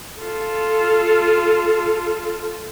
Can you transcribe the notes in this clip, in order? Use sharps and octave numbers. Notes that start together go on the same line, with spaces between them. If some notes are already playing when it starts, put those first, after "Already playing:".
F4 A4